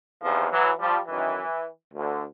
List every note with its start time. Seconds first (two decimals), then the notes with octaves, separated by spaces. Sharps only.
0.22 E2 C3 D#3 F3
0.50 E3 F#3
0.78 F3 G3
1.07 F#2 D#3 E3
1.93 D2 D3